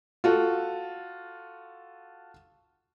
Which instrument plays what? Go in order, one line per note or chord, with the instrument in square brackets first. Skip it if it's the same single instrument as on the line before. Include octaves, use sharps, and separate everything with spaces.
[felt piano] F4 F#4 A4